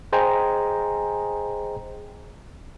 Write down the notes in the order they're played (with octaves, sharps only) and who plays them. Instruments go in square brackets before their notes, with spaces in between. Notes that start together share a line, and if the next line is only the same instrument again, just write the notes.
[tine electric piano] G#4 C5 D#5 G5 G#5 A#5